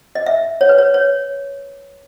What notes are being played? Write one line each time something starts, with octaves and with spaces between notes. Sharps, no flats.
D#5
E5
C#5
B4
C#5
C#5